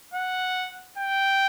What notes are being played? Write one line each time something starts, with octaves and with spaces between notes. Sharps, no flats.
F#5
G5